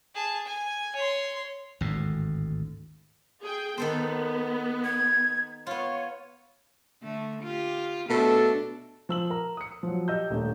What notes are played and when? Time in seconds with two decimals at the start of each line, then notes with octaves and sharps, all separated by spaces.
0.15 G#4 A5
0.45 G#5
0.95 C#5 C6
1.81 G#1 D2 A2
3.41 G#4 G5
3.78 D#3 B3 A4 C5
4.84 G#6
5.67 B3 F4 C#5
7.03 D3 A3
7.43 F4 G4
8.10 B2 A3 D4 A4
9.09 F3 E6 F#7
9.30 A#4 A#5
9.57 D#6 C#7
9.83 F3 F#3
10.08 G4 D#5 E6 G6
10.30 D#1 A3 D4